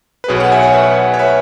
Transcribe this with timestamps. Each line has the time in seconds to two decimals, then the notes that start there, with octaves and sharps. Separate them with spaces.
0.24 B4
0.28 B1 B2 G#4 C#5
0.40 C#5 F#5
0.52 E5 G#5
0.62 C#5 F#5
0.74 B4 E5
1.14 C#5
1.19 B4 E5